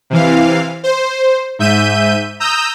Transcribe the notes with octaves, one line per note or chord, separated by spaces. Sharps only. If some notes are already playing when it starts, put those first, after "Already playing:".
C3 E3 F5
C5
G#2 E5 G6 D#7
A#5 D#6 E6 G6